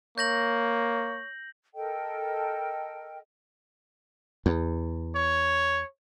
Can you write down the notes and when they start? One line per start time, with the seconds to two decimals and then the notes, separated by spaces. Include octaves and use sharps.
0.18 A#3 C#5 G6 A#6 F#7
1.74 A4 A#4 D#5 G5
4.46 E2
5.15 C#5